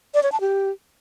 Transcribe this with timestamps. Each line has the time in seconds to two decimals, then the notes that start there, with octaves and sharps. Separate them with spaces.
0.14 D5
0.23 C#5
0.32 A5
0.41 G4